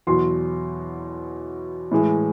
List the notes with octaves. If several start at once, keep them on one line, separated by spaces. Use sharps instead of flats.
E2 B2 F#3 C6
A2 E3 G#3